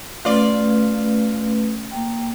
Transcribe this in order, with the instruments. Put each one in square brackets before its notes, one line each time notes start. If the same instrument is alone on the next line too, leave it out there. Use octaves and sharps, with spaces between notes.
[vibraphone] A3 C#4 B4 [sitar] F4 D5
[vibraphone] A#3 G5